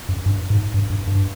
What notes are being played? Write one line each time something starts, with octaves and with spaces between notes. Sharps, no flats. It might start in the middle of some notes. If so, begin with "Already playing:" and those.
F#2
G2
G#2
G2
G2
G2